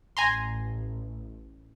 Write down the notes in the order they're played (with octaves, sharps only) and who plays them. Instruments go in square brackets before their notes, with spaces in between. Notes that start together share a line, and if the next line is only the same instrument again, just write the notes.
[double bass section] A1 [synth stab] G#5 A#5 C6